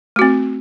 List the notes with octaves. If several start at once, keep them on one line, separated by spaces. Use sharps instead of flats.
A3 C4 F#4